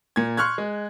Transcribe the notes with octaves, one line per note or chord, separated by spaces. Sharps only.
A#2 G#6
C6 C#6 F6 F#6 G#6
G#3